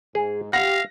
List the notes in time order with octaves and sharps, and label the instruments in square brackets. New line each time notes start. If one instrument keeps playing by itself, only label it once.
[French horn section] G#2 [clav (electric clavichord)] G#4
[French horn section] G4 [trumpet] F5 [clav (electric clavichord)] F#5 [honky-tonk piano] A#6